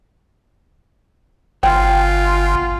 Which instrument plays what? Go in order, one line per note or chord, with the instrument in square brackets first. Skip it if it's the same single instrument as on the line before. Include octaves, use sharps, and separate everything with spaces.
[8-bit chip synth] G1 [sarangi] F4 [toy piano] G5